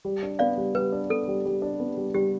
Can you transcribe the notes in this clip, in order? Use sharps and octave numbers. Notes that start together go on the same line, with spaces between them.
G3
D4
B3 D5 F5
G3
G3 B4
D4
B3 A4
G3
G3
D4
B3
G3
G3 G4